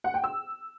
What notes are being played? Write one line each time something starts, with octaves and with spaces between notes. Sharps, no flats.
F#5
G5
E6